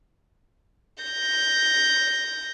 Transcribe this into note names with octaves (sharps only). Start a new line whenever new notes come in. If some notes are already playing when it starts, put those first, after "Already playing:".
G6 A#6